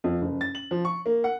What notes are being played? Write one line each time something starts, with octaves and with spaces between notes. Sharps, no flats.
F2
F#1
A6
F#7
F3
C#6
A#3
F#5